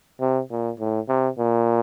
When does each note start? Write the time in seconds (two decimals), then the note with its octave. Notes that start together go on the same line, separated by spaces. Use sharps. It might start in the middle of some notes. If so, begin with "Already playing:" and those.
0.20 C3
0.51 A#2
0.80 A2
1.08 C3
1.38 A#2